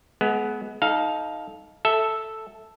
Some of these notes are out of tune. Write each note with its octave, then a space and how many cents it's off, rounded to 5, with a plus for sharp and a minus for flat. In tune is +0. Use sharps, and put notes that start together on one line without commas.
G#3 +35 B3 +0
D#4 +15 A4 -20 F5 +0
A4 +0 E5 +0